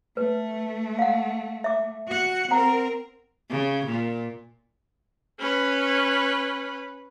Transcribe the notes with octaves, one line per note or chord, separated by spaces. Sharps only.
A3 B4
F5 F#5
E5 D6
F#4 F#5
C4 A#4 F#5 A#5
C#3
A#2
C#4 B4